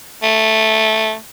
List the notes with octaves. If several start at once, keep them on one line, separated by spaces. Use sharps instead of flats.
A3